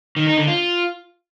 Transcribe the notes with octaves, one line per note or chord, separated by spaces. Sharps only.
D#3
D#4
D3
F4